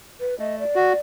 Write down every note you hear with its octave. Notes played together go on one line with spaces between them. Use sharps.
B4
A3 D#5
D5
F#4